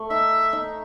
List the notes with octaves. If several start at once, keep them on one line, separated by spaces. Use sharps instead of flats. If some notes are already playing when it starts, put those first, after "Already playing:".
Already playing: A3
D#4 E5
D#4